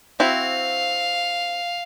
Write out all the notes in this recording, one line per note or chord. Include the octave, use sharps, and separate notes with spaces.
C4 E4 F#4 F5